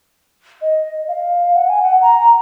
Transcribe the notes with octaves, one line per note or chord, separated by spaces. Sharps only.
D#5
F5
F#5
G#5
F#5
A#5